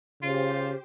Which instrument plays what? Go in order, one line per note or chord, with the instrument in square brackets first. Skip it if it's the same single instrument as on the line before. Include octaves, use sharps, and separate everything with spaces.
[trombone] C#3 [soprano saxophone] F4 [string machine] G4 C5